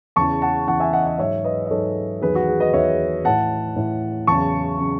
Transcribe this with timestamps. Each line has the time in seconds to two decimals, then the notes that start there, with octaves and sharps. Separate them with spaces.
0.16 E2 C#3 E3 A5 C#6
0.42 F#5 A5
0.67 E2 C#3 E3 F#5 A5
0.80 E5 G#5
0.93 D#5 F#5
1.06 D#5 F#5
1.19 G#2 F#3 C#5 E5
1.44 B4 D#5
1.66 D#5
1.70 G#2 F#3 A4 C#5
2.22 E2 D#3 F#3 G#4 B4
2.35 F#4
2.48 G#4
2.60 B4 D#5
2.74 E2 D#3 F#3 C#5 E5
3.25 A2 E3 F#5 A5
3.76 A2 E3
4.27 E2 C#3 F#3 A5 C#6
4.80 C#3 F#3